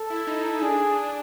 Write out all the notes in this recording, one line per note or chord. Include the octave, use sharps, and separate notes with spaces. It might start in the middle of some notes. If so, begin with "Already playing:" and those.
Already playing: A4
E4
D#4
D#4
D4 G#4
D4